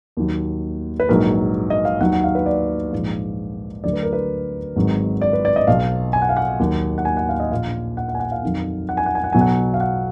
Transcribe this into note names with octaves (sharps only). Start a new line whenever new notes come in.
D#2 D#3 F#3
B4
A#1 G#2 D#3 F#3 A#4
D#5
F5
D#2 D#3 F#3 F#5
F#5
F5
B4
D5
A#1 G#2 F3
D2 D3 F#3 D5
B4
A#4
B4
G#1 G#2 D#3 F#3
D5
B4
D5
D#5
B1 B2 F#3 F5
G#5
F#5
F5
F#5
D#2 D#3 F#3
F#5
G#5
F#5
F5
D#5
A#1 A#2 F3 F5
F#5
F#5
G#5
F#5
F5
F2 D#3 F#3
F#5
G#5
F#5
G#5
F#5
B1 B2 F#3 G#5
F#5
F5
F#5